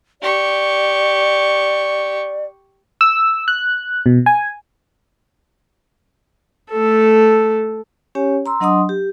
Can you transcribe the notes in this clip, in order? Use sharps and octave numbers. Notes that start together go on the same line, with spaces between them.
G4 D5 C#6
E6
F#6
B2
G#5
A3 A4
C#4 G4 C#5 G#5
A#5 C6 E6
F#3 D4 D#5 F#5 C6 D#6
G4